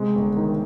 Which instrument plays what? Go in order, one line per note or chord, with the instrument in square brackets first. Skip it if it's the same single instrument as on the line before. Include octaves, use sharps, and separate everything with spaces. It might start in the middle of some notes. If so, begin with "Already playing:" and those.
Already playing: [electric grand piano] C3 G#3
G1
D#3